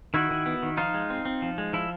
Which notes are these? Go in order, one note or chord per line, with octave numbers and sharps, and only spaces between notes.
D#3 E4 F#4
D#3
B3
D#3
F3 D#4 F4
G#3
C4
C4
F3
G#3
F3 E4